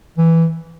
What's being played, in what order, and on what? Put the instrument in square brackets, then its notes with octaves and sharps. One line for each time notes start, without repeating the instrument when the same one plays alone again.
[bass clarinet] E3